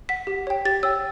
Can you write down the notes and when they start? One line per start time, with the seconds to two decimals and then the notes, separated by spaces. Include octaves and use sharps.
0.09 F#5 B6
0.27 G4
0.47 C#5 G5
0.65 G4 A6
0.83 C#5 G5 E6